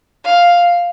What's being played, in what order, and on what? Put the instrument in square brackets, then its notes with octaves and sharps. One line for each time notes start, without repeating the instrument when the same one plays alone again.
[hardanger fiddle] F5